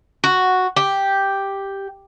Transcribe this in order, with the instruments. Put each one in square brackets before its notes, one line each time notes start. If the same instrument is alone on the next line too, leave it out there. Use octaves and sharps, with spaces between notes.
[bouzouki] F#4
G4